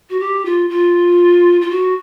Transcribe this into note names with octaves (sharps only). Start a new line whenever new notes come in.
F#4
G4
F4
F4
F4
F#4